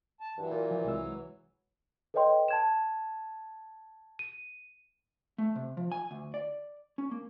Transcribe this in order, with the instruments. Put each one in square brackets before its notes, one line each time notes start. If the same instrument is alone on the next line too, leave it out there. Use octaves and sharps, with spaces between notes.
[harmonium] A5
[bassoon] G2 [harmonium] E3 F#3
[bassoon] A#2
[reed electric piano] F3
C2 G#3 E6
[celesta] A4 B4 C#5 D#5 G5 C6
A5 G#6 E7
D#7
[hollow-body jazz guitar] A3
C3
F3
G#5
D2
D5
C#4
A#3